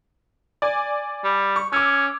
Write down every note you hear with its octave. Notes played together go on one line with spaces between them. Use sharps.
D5 G#5
G3
C#6
C#4 D6 E6